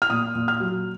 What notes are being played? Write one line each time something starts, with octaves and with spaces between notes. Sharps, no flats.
F6
A#2 D#6
A#2
F6
F#3